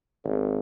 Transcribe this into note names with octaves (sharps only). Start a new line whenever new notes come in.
G#1